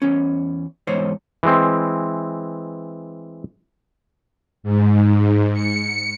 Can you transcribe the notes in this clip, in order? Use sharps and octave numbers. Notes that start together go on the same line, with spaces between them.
E2 C#4
E2 G#2 C5 C#5
E3 G#3 C4
G#2
C#7